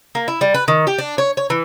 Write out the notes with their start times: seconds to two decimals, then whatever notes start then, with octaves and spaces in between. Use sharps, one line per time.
0.15 A#3
0.28 E4
0.41 G3
0.54 B4
0.68 D#3
0.87 G4
0.98 D4
1.18 C#5
1.37 C#5
1.50 E3